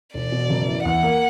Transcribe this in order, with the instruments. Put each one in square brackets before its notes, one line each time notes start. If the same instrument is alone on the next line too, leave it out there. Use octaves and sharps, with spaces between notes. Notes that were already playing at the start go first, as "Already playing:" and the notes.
[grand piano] E1 [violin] D5
[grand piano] B2
F#1
E3
[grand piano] E2 [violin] F#5
[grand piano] A#3